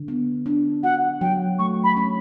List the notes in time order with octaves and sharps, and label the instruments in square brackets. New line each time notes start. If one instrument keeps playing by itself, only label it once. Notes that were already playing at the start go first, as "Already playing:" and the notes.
Already playing: [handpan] D3
B3
D4
[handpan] F#4 [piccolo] F#5
[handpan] F#3 [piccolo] G5
[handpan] A3 [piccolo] C#6
[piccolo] B5
[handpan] C#4